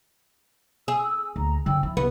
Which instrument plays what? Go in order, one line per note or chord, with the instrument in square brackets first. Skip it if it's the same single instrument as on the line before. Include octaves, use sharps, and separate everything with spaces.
[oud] G#4 [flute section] G#5 E6
[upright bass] D2 [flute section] A#5
[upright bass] F#2 D3 [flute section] C#4 G5 E6
[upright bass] F3 [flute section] E4
[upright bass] C2 [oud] B3